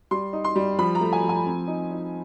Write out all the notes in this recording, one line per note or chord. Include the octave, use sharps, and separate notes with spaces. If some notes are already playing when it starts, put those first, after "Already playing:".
G3 C6
D#4
C6
G3
F3 B5
A#5
A3
G#5
F3
G#5
C4
D#4
D#4